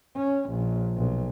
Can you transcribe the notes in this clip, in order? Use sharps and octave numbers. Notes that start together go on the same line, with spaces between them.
C#4
A#1
B1